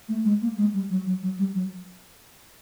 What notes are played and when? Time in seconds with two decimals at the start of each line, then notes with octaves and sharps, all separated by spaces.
0.08 A3
0.24 G#3
0.42 A#3
0.57 G#3
0.74 G3
0.90 F#3
1.06 F#3
1.23 F#3
1.39 G3
1.55 F#3